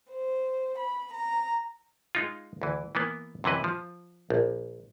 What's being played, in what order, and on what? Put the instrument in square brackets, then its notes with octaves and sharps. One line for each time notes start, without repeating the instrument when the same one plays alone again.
[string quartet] C5
B5
A#5
[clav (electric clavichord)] G#3 D#4 F4
D2 E3
E3 A#3 B3
F#2 C3 E3 B4 D#5
F3
A#1